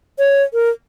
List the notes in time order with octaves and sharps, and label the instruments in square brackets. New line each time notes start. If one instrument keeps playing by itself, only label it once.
[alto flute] C#5
A#4